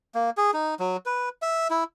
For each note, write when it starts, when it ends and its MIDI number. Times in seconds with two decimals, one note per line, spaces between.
0.15 0.30 58
0.37 0.51 68
0.54 0.75 63
0.80 0.97 54
1.06 1.29 71
1.42 1.68 76
1.70 1.84 64